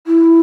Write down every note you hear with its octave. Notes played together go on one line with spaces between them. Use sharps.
E4